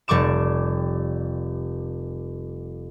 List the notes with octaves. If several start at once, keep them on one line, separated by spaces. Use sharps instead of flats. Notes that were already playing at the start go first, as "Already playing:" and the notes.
F1 G3 C#6 D6 E7